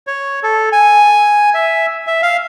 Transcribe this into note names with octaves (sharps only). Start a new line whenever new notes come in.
C#5
A4
G#5
E5
E5
F5